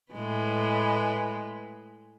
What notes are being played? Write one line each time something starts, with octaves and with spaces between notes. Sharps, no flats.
A2 G#3 B4